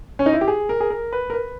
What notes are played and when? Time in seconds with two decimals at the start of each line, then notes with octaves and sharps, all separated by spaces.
0.19 C#4
0.26 D#4
0.33 E4
0.41 G4
0.48 G#4
0.69 A#4
0.80 G#4
0.90 A#4
1.13 B4
1.30 A#4
1.34 B4